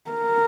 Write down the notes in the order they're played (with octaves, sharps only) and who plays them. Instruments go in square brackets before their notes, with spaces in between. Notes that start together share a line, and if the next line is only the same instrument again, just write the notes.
[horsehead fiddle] A#4